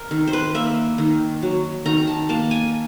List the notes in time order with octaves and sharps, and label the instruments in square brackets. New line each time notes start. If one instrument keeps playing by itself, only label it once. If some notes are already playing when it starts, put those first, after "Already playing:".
Already playing: [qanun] A#4
D#3
C5
B4
A#3 E5
D#3
F#3
D#3 A#5
A5
A#3 A5
G#5